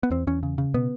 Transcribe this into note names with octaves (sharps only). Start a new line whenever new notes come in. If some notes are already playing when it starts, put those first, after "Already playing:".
B3
E2 C4
E2 C#4
C#3
C#3
B2 B3